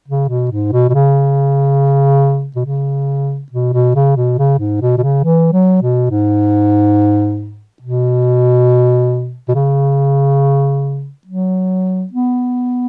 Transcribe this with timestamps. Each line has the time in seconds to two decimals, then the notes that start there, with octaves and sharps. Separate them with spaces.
0.08 C#3
0.29 B2
0.51 G#2
0.72 B2
0.89 B2
0.94 C#3
2.56 B2
2.65 C#3
3.52 B2
3.74 B2
3.95 C#3
4.16 B2
4.39 C#3
4.59 G#2
4.82 B2
4.98 B2
5.03 C#3
5.24 E3
5.53 F#3
5.82 B2
6.10 G#2
7.82 B2
9.49 B2
9.55 C#3
11.27 F#3
12.13 B3